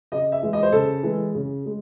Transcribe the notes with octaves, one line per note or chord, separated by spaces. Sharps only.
C#3 D#5
E5
E3 G#3
D#5
C5
C#3 A4
E3 G#3
C#3
G#3